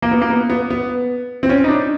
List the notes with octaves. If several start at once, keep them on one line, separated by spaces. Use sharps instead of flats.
A#3
B3
A#3
B3
B3
B3
C4
C#4
D#4
D4